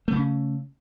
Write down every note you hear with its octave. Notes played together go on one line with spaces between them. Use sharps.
C#3 A3 C#4